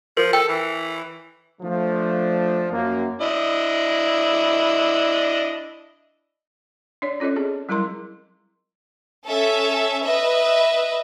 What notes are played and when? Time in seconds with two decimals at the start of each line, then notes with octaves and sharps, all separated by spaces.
0.17 F3 A#4
0.33 A4 G5
0.49 E3
1.61 F3 A3 D4
2.70 F#2 A#3
3.21 D4 E4 D#5
7.02 D4 C#5 D5
7.20 C#4 F4 A4 C#5 D#5
7.36 C4 G#4
7.69 F#3 G3 E4 A#4 A#5 C6
9.27 C#4 A4 E5
10.03 B4 D#5 E5